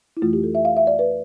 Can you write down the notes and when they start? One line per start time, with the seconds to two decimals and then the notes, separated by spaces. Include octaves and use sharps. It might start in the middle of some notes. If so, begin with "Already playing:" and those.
0.17 E4
0.22 F2 E3 A3 F4
0.33 G4
0.43 A4
0.55 E5
0.65 F5
0.77 E5
0.87 D5
0.99 B4